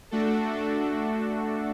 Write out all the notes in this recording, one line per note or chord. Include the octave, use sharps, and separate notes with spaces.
A3 D4 F#4 A4